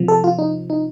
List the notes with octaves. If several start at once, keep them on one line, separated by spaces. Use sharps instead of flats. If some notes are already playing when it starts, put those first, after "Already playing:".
Already playing: C3 F3
A4
F4
D#4
D#4